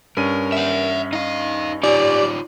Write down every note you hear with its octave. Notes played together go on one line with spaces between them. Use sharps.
G2 C#4 A#4 D#7
E5 F#5
D#4 D#5 F5
D#4 F4 G4 C#5 D5 G#5